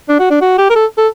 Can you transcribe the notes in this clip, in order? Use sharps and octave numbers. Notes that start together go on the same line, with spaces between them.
D4
F#4
D4
F#4
G4
A#4
A4
A4